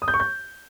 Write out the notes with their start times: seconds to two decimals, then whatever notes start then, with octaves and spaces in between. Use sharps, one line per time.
0.02 D#6
0.08 G6
0.14 C#6
0.20 G6